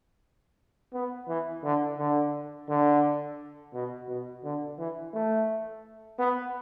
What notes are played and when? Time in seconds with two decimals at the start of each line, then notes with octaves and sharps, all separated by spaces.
0.93 B3
1.28 E3
1.63 D3
1.98 D3
2.69 D3
3.74 B2
4.09 B2
4.44 D3
4.79 E3
5.14 A3
6.19 B3